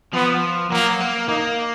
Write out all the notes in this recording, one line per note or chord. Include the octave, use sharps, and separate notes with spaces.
F3 B3
F#3 A#3
A#3
A#3 D#4